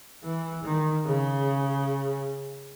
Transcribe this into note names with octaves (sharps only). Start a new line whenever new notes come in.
E3
D#3
C#3